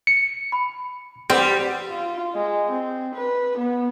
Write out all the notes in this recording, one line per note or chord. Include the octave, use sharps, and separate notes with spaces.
C#7
B5
G3 C4 B4 F#5
F4
G#3
C4
B4
B3